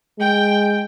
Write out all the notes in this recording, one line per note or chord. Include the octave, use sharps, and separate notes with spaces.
G#3 G5